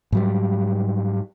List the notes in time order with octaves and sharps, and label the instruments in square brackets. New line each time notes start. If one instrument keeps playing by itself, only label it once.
[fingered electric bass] G#2 F#3 G3